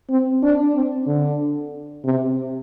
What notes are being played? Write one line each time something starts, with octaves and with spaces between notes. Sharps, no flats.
C4
D4
C4
D3
C3